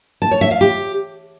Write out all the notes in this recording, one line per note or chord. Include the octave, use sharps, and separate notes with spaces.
A5
C#5
E5
F5
G4